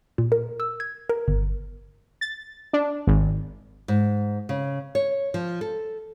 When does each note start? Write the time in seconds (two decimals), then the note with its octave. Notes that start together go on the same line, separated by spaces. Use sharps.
0.18 A#2
0.32 A#4
0.60 E6
0.80 G#6
1.09 A#4
1.28 G1
2.21 A6
2.73 D4
3.07 G#1
3.88 G#2
4.49 C#3
4.95 C#5
5.34 F3
5.61 A4